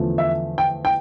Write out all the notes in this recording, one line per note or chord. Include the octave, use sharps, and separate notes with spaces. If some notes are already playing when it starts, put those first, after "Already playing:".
Already playing: E2 D3 F3 A3
E5
G5
G5